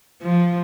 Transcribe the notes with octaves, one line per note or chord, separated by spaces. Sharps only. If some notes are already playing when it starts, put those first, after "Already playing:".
F3